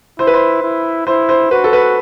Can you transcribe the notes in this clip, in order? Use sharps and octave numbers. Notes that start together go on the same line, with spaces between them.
E4 C5
B4
C5
E4
E4 C5
C5
F#4 B4
A4
B4